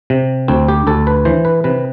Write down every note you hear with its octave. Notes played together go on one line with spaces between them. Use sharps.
C3
D2 C4
G4
D2 A4
B4
E3 C5
B4
C3 B4